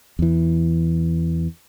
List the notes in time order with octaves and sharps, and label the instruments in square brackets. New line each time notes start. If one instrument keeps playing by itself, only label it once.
[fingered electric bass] E2 E3